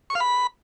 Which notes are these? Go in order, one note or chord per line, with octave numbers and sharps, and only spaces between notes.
C#6
F5
B5